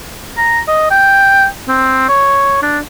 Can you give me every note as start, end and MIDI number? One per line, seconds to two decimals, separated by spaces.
0.37 0.60 82
0.68 0.90 75
0.91 1.46 79
1.68 2.09 60
2.09 2.58 73
2.62 2.79 62